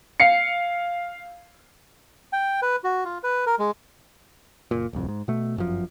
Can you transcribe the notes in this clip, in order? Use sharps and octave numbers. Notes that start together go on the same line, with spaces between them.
F5 C7 C#7
G5
B4
F#4
F4
B4
A#4
G#3
F#1 A#2
D1 C2 F2
G#2
B2 A3
G1 F#2 F3